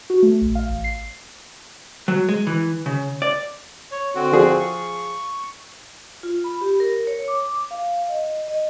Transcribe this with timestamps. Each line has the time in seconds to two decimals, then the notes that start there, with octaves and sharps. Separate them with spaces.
0.10 F#4
0.23 A3
0.42 A#1
0.55 F5
0.69 A1
0.84 C7
2.08 F#3
2.29 G#3
2.47 E3
2.86 C#3
3.22 D5
3.92 C#5
4.15 D3 C4 F#4
4.32 F3 G#4
4.60 C#6
6.23 F4
6.44 B5
6.61 G4
6.80 A#4
7.07 C#5
7.28 D6
7.71 F5
8.09 D#5
8.48 D#5